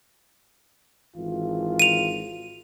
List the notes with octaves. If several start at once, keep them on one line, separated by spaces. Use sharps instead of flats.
G#1 E3 F4
D#7 F7